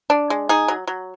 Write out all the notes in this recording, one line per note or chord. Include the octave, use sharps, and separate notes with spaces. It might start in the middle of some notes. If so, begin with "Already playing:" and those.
D4
G#3
D#4 G#4
F#3
F#3